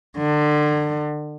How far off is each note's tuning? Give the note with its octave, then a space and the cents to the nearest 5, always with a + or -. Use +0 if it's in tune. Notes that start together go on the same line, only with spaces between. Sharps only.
D3 +30